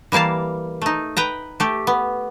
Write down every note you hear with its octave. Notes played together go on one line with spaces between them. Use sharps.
E3 G3 A#3 F5 A5
A3 D#4
B4 G5 A#5
A3 G4
B3